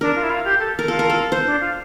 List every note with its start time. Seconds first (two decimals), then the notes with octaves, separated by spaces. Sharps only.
0.01 D4 A#4
0.16 F4
0.23 E4
0.30 F4
0.44 G4
0.59 A4
0.79 A#4
0.88 F4 A4
0.99 A#4
1.10 A4
1.32 C5
1.46 D4
1.61 F4